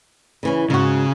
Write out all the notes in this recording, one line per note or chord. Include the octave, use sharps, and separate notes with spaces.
C#3 E3 C#4
G#2 C#3 F#4